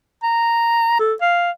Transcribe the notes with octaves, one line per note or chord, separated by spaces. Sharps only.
A#5
A4
F5